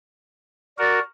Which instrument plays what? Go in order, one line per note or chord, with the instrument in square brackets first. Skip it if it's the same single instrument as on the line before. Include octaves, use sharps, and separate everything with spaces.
[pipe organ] F#4 A#4 [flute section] D5